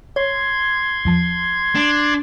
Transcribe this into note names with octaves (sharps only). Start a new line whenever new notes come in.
C#5 C6 G#6
E2 F3 A5
D4